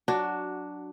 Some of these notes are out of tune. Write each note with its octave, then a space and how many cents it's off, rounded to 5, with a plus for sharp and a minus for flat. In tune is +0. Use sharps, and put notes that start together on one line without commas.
F#3 +0 D4 +0 F#4 +10